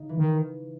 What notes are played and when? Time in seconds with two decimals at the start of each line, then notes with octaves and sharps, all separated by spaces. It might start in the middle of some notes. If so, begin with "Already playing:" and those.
Already playing: C#3 D#4
0.09 E3
0.18 D#3